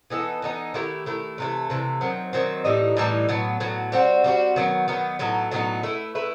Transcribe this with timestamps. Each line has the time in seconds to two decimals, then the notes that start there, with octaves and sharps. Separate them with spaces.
0.10 E3 B3 D#4 A4
0.42 E3 B3 D#4 A4
0.74 D#3 A3 E4 G4
1.06 D#3 A3 E4 G4
1.38 C3 E3 A3
1.70 C3 E3 A3
2.01 D#3 F#3 C4
2.33 D#3 F#3 C4
2.65 A2 E3 G3 D#4
2.97 A2 E3 G3 D#4
3.29 A2 F#3 B3
3.60 A2 F#3 B3
3.92 G3 C4 F#4
4.24 G3 C4 F#4
4.56 D#3 F#3 B3
4.88 D#3 F#3 B3
5.19 A2 F#3 B3 D#4
5.51 A2 F#3 B3 D#4
5.83 A3 E4 B4
6.15 A3 E4 B4